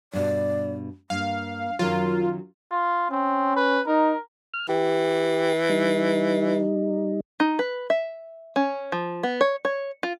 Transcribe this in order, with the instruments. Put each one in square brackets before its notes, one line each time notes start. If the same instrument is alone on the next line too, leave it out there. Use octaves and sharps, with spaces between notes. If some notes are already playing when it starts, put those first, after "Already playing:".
[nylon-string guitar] G2 B2 [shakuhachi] D5
[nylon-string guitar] G2 [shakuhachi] A#3 [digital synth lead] F5
[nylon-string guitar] F#2 D#3 F#3 [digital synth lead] F4 [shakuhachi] A#4
[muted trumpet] F4
[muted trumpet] C4 [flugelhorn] C#4
[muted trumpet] B4
[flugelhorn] D#4 [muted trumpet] A#4
[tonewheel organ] F6
[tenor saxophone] E3 [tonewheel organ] G4
[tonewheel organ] G3 D#4
[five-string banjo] D#4
B4
E5
C#4
F3
B3
C#5
C#5
F4